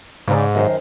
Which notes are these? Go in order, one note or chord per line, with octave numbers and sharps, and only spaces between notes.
G#2 C#3 D5
F#2 D#3 C5